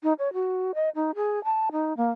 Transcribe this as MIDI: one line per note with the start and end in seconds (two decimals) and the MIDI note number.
0.03 0.13 63
0.19 0.32 73
0.33 0.71 66
0.75 0.89 75
0.95 1.11 63
1.15 1.43 68
1.44 1.69 81
1.72 1.96 63
1.97 2.10 58